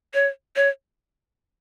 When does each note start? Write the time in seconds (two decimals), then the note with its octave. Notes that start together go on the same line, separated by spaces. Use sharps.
0.14 C#5
0.56 C#5